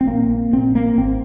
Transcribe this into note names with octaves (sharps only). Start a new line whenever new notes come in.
C4
A#1 A#2 A#3
A#1 A#2 C4
A#3
G#1 C4